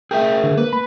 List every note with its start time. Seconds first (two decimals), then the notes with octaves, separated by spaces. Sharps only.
0.11 G#4 A#4 E5 G5
0.44 D3
0.57 A#3 B4
0.73 B5